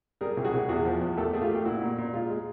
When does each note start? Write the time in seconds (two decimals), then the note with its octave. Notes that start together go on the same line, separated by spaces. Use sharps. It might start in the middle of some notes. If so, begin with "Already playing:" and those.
0.21 G3 G#4 A#4
0.37 C2
0.44 F#4 G#4
0.53 C2
0.69 E2 F#4 G#4
0.85 F3
1.01 E2
1.17 A3 G4 A4
1.33 A3 G#4
1.41 F4 G4
1.50 A3
1.55 G4
1.65 A#2 E4 F#4
1.82 A#2
1.98 A#2
2.13 G#3 F4
2.30 G#3